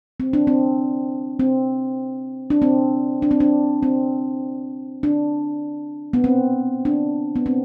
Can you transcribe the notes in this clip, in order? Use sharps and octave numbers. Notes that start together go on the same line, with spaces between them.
C4
D4
C4
C4
D4
C4
D4
C4
D4
C4
D4
B3
C4
D4
B3
C4